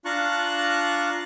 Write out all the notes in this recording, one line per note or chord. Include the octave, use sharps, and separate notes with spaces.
D4 F4 A5 A#5 C#6 F#6